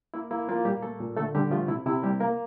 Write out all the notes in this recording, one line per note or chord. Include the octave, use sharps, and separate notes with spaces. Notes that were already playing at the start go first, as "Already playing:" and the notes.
A#3 E4
A#3 E4
F3 A#3 F4
A#2 G3 G4
A3 A4
A#2
D3 A3 A4
D3 G3 G4
F3 A3 F4
C3 E4
C3 E4
G3 A#3 G4
A#3 A#4